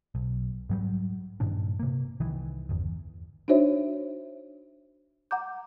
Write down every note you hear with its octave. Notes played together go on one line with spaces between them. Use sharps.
B1
G#2 F#3 G3
G2 A#2 D#3 D4
C3 A#3
C2 D#3 E3
G1 E2
D4 D#4 F#4 C5 C#5 E5
F#5 A#5 D6 G6